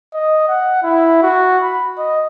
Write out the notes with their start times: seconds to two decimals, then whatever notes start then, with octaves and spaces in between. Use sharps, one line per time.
0.14 D#5
0.48 F#5
0.83 E4
1.23 F#4
1.63 B5
1.98 D#5